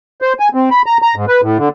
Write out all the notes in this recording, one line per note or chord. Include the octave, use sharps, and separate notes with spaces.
C5
G#5
C4
B5
A#5
A#5
G#2
B4
A2
D3